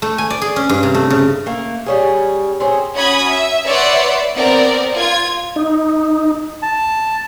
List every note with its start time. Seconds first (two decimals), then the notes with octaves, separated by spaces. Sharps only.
0.02 A3
0.18 G#5
0.30 D5
0.42 G#4
0.56 C#4
0.69 G2
0.83 C3
0.94 A3
1.10 C#3
1.46 A3 A#3
1.86 G3 C#4 G#4
2.60 C4 C#4 G#4
2.95 C#4 F#4 B5 D#6 G#6
3.29 E5
3.67 B4 C#5 D5 E5 F#5 C6
4.36 B3 C4 A#4 D5
4.94 F4 G#6
5.56 D#4
6.62 A5